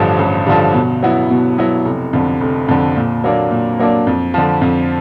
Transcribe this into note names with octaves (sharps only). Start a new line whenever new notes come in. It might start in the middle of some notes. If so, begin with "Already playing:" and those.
Already playing: A1 G2 D3 F3
A1
G2 D3 F3
B2
F#3 B3 E4
B2
F#3 B3 E4
F1
F2 D3
F1
F2 D3
A#2
F#3 A#3 D4
A#2
F#3 A#3 D4
F2
D3 F3
F2